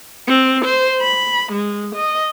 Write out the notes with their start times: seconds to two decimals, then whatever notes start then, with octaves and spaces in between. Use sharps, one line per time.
0.28 C4
0.65 C5
1.01 B5
1.52 G#3
1.96 D#5